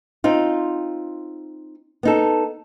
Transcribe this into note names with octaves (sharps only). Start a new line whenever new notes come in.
C4 D#4 F4
B3 D#4 A4